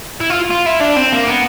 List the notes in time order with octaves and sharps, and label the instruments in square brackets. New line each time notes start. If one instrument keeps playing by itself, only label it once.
[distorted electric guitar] E4
F4
F4
E4
D4
C4
A#3
B3